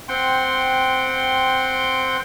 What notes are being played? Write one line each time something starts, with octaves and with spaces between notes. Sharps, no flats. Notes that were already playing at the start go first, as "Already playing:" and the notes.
C4 F#5 G5 C6